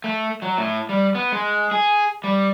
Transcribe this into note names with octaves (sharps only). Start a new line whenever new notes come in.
A3
F#3
A2
G3
B3
G#3
G#4
G3